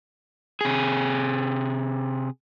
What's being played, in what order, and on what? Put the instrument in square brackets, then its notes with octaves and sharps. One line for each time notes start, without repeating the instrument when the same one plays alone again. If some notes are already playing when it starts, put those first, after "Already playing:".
[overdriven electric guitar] C3 G#4